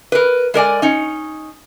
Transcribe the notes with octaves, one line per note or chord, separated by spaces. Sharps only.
A#4 B4
G#3 A#4 D5 G#5
C#4 D#4